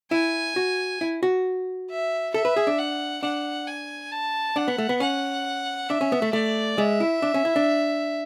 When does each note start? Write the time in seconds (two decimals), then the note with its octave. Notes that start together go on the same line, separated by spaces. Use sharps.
0.11 E4 G#5
0.56 F#4
1.01 E4
1.23 F#4
1.90 E5
2.34 A4 E5
2.45 B4
2.56 G#4
2.67 D4
2.79 F#5
3.22 D4 F#5
3.67 G#5
4.11 A5
4.56 D4 F#5
4.68 B3
4.78 A3
4.89 B3
5.00 C#4 F#5
5.89 D4 E5
6.01 C#4
6.12 B3
6.22 A3
6.33 A3 D5
6.78 G#3 E5
7.00 E4
7.22 D4
7.34 C#4
7.45 E4
7.56 D4